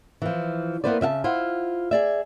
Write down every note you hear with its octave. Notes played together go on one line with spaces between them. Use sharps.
E3 F3
A#3 B3 E4 B4 C5 D5
C#3 E5 F5 A5
E4 F4 C5 F#5
G#4 D5 E5